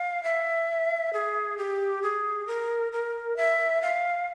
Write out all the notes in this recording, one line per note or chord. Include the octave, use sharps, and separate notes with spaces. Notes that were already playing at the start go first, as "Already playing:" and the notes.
Already playing: F5
E5
G#4
G4
G#4
A#4
A#4
E5
F5